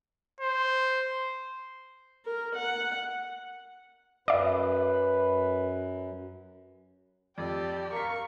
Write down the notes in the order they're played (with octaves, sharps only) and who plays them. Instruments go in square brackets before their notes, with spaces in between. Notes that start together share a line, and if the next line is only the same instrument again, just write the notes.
[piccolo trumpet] C5
[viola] A#4
F#5
[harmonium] F#2 [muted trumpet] B4 [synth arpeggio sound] D5 E5
[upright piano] F2 [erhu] G4 [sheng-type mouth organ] D5
[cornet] A#4 [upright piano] F5 B6 [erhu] C#6